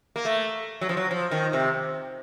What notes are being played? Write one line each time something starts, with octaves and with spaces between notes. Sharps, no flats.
A#3
A3
F#3
F3
F#3
F3
D#3
C3